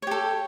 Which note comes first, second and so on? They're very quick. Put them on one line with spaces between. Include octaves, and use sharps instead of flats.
C#5 G4 A4